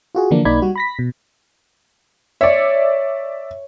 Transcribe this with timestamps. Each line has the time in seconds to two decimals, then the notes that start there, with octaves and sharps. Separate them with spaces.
0.15 F4 F#4 G#4
0.31 D3 E3 F3 A#3 D4
0.45 B1 A#3 D#4 D5 B5 G#6
0.62 G3 F#4
0.76 B5 A#6 B6
0.99 B2
2.41 C#5 D5 E5